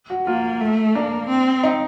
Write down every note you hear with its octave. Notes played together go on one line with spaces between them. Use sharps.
F#4
A#3 F4
A3
A#3 D4
C4
D#4